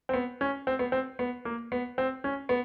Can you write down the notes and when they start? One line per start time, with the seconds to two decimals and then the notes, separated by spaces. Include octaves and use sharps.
0.09 C4
0.13 B3
0.41 C#4
0.67 C4
0.79 B3
0.92 C4
1.19 B3
1.45 A#3
1.72 B3
1.98 C4
2.24 C#4
2.49 B3